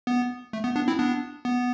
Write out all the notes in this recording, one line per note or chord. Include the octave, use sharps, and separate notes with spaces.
B3
A3
B3
B3 D4
C4 E4
B3 D4
B3